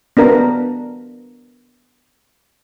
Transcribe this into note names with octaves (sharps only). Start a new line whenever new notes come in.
B3 D4 A#4 A#5